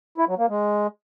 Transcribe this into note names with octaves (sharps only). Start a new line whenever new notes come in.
E4
F#3
A#3
G#3